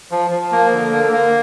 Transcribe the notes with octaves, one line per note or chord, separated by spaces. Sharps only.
F3
F3
A#3
D3
A#3
A#3